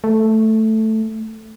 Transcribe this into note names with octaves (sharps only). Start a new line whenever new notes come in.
A3